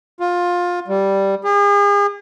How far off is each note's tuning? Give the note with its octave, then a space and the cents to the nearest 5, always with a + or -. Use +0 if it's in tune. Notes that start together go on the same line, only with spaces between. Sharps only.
F4 +20
G3 -5
G#4 -40